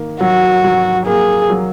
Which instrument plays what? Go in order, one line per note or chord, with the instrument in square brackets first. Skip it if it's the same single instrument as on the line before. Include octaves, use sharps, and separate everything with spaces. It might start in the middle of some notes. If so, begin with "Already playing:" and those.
Already playing: [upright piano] D#3 A#3
[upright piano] F#3 [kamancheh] F#4
[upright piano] F#3
[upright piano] A#3 [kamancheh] G#4
[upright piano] F#3